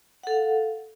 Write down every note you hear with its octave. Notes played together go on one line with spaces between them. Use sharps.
A4 F5 F#5